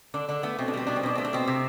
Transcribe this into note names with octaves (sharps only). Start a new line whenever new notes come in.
D3 D4
D3 D4
A3 B3
B2 C4
D4
G3 C4
B2 D4
C4
B2 D4
A3 C4
D4
B2 C4
C3